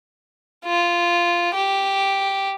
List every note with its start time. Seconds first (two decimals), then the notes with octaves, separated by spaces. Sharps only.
0.65 F4
1.54 G4